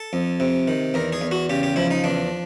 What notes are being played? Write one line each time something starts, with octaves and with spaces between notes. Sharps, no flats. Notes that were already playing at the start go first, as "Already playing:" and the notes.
Already playing: A4
F2
C3
D#3
E2 A#4
G#4
E2
F#4
C#3 G4
G4
F3 E4
D#4
E2 D4